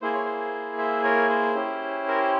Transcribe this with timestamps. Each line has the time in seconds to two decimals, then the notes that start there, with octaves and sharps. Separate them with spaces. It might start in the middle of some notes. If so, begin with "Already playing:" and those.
0.02 A#3 E4 G#4 C5
0.13 C#5
0.25 C5
0.78 C5 E5
1.03 A#4 C#5
1.29 C5
1.55 C#4 E4 G4
2.08 A#4
2.20 C5